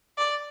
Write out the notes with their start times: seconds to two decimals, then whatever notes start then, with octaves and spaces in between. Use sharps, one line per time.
0.17 D5